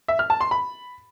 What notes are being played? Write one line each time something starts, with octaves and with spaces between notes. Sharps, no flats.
E5
F6
A5
C6
B5